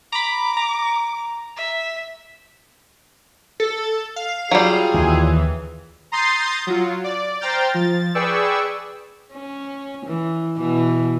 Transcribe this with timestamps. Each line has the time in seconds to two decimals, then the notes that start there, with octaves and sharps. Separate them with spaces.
0.12 A#5 B5 D6
0.57 A#5
1.57 E5
3.60 A4
4.16 F5
4.51 F#3 G3 F4 G#4
4.94 D#2 D#3 E3
6.12 A#5 C6 D#6 G6 A6 C7
6.67 F#3 F4
7.04 D5
7.40 C5 G5 A#5 F6 G6 A6
7.74 F3 A6
8.15 G#4 B4 D5 G5 C#6 E6
9.33 C#4
10.06 E3
10.57 B2 E3